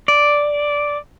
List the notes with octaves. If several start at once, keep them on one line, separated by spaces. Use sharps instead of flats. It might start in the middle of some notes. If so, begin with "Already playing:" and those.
D5